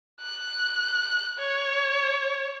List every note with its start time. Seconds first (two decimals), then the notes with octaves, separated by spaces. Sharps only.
0.21 F#6
1.39 C#5